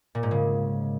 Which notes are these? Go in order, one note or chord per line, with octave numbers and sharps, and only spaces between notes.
A#2
G#2
C#3